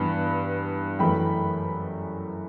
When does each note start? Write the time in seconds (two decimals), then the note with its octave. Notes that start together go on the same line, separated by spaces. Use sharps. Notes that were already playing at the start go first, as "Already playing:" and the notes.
Already playing: G2 E3 B3 B5
0.99 F#2 E3 A3 G5 B5